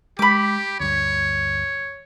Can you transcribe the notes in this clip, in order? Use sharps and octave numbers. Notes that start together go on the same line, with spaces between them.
G#3 G4 B5 D6
D2 G2 C#5